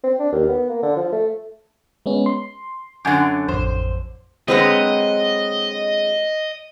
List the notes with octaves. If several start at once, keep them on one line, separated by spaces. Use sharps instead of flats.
C4
D4
D#2
B3
A#3
D3
F3
A3
G#3 B3 C#4
C6
F#2 D3 F#5 G#5 D6
A1 F2 C5
D3 F#3 G#3 C4 B4 D#5 A#5